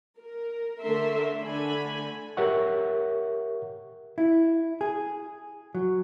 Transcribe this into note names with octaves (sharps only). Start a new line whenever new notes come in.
A#4
D3 A3 A4 A#4 E5 C6
D3 A3 G#5 B5
G4 A#4 C#5 E5 F#5 C#6
E4
G#4
F#3